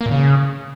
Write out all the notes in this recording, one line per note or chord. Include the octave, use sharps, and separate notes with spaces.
A#3
A#2
C#3